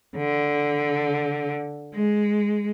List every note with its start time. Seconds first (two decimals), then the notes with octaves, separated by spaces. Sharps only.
0.16 D3
1.94 G#3